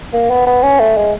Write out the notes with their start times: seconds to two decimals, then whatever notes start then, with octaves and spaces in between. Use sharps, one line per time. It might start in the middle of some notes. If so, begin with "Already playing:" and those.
0.13 A#3
0.30 B3
0.47 B3
0.63 C#4
0.80 A3
0.97 G#3